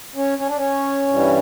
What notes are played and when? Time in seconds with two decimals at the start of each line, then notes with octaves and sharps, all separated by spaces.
0.15 C#4
0.38 C#4
0.48 D4
0.57 C#4
1.08 G2 E3 G3